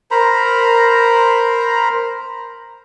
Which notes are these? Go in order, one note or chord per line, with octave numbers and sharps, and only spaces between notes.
A#4 C5 A#5 B5